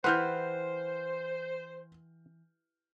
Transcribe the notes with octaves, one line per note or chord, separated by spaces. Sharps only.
E3 G4 B4 C5 F#5 C6 F6 G6